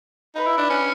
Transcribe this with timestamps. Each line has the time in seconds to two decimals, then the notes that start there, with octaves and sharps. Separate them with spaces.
0.35 D#4 B4
0.46 E4
0.58 D4
0.70 C#4